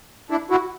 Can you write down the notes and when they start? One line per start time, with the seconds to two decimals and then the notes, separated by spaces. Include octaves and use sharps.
0.30 D4 E4
0.50 E4 F#4